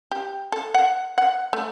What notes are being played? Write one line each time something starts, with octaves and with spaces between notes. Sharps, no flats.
G4
A4
F#5
F#5
A3